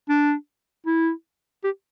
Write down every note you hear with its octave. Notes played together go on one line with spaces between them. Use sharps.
D4
E4
G4